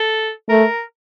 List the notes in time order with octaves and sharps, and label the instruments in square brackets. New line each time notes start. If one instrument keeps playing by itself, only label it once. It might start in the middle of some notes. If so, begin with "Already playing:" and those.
Already playing: [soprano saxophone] A4
[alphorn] A3 [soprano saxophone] A#4